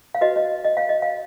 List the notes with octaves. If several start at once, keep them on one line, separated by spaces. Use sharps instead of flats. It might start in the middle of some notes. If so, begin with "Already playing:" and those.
F5
F#4 B4 D#5
D#5
D#5
F5
D#5
F5